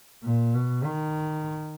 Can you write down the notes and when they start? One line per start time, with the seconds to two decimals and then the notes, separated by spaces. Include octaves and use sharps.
0.23 A#2
0.54 B2
0.85 D#3